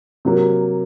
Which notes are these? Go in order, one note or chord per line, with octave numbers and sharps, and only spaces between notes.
C3 F#3 A#3